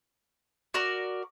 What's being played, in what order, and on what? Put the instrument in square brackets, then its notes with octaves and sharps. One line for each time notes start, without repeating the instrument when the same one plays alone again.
[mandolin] F#4 A#4 D5